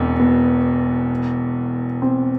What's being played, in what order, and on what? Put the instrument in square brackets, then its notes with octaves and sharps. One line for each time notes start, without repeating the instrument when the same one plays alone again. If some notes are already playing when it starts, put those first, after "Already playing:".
Already playing: [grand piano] E1 E2 B2 [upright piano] C4
[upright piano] B3
C4